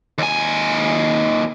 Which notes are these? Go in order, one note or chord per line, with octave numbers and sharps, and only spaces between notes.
D#2 G#5